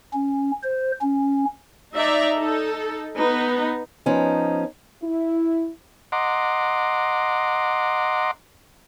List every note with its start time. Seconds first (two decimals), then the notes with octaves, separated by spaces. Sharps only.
0.13 C#4
0.63 C5
1.01 C#4
1.95 D#4 D5 E5 A#5
2.37 D#4 A4
3.19 B3 D#4 B4
4.06 F3 B3 C#4 D#4
5.03 E4
6.12 D#5 F#5 A#5 C6 D6